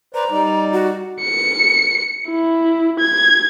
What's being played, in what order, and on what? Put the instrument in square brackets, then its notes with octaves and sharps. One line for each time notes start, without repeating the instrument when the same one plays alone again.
[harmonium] B4 C5 D5 [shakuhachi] A#5
[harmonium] G3 D#4 D5
[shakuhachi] F#4
[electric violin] C#7
E4
G#6